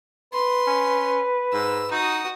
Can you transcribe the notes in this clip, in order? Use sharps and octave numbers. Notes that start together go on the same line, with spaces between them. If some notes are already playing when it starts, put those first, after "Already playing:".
B4 C6
C#4
G#2 E6
D#4 F#4 D#6